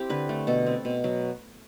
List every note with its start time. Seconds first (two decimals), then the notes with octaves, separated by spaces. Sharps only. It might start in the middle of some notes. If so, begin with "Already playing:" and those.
Already playing: C4 E4 G4
0.10 D3 B4
0.29 A3
0.47 B2 A4
0.66 C4
0.85 B2
1.04 F#3